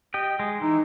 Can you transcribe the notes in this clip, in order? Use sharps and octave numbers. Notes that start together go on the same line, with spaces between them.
G4 D#5 G5
G#3
E3 D#4